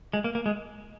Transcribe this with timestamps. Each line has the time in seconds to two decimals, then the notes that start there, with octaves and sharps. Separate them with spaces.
0.13 G#3
0.24 A#3
0.35 A#3
0.46 G#3